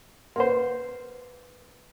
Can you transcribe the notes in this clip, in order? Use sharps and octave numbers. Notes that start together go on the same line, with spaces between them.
A#3 B4 C5 F#5 C6